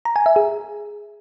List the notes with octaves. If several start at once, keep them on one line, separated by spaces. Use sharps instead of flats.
A#5
G#5
E5
G#4